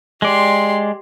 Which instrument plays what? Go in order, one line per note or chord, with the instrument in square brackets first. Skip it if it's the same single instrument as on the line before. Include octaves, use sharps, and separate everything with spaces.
[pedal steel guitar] G#3 D5 [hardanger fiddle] G4 C6